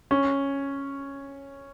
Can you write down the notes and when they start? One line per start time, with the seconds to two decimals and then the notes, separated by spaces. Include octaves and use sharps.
0.11 C#4